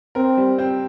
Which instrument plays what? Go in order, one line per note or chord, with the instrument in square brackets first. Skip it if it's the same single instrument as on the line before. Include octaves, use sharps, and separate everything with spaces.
[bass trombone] C4 [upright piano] A#4
[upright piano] G3
C4